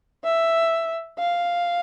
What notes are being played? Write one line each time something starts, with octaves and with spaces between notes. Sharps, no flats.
E5
F5